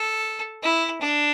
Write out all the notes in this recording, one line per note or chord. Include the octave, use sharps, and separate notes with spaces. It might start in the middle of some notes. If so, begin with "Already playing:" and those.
Already playing: A4
E4
D4